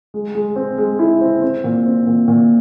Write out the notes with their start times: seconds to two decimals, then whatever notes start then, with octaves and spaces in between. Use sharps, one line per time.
0.14 G#3
0.35 G#3
0.56 C4
0.78 G#3
0.99 E4
1.21 C4
1.42 C4
1.64 A#2
1.86 C4
2.07 A#2
2.28 A#2